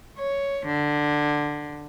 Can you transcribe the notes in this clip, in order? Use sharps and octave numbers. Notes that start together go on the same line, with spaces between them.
C#5
D3